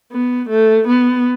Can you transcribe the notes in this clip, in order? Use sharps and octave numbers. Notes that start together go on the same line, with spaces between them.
B3
A3
B3